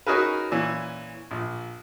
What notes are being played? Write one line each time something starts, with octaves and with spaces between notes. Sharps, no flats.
C#4 D#4 F#4 G#4 A#4 B4
A#2 E3 C#4
A#1